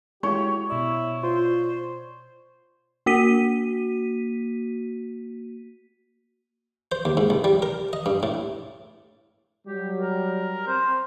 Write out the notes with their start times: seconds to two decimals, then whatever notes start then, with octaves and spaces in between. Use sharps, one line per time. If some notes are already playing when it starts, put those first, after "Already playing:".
0.23 G#3 E4 F#4 G4 C#5
0.69 B2 E4 D5
1.23 F4 C5
3.06 A#3 F#4 B6 D#7
6.92 C5
7.05 D#2
7.17 G#2
7.30 C2
7.44 G3
7.62 A#4
7.93 D#5
8.06 G2
8.23 A2
9.67 F#3 G3 G4
9.99 A#4
10.68 C4 C5